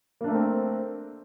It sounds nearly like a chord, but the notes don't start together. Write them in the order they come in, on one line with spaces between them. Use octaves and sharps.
A#3 D4 A3 A#4 C4